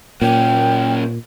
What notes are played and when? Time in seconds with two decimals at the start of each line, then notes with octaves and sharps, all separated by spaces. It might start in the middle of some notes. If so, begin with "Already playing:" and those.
0.22 A#2 A#3 C#4 G5